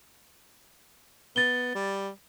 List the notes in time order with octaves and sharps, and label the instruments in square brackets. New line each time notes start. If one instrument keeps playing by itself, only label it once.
[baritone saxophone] B3 [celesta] A6 G7
[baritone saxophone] G3